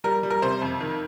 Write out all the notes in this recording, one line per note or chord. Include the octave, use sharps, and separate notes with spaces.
G3 A#4
G3
A#4
C3 C5
F2
D#3